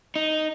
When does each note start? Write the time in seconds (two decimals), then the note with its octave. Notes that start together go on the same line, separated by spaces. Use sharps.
0.16 D#4